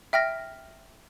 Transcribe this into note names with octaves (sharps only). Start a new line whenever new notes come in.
E5 G5 F6 A#6